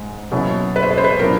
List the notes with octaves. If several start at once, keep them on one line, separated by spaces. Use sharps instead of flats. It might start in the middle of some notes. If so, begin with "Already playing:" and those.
Already playing: G#2 G#3
B2 F#3 A#3 C#4 E4
B4
C5
B4
C5
B4
A#2 F#3 B3 D4 A#4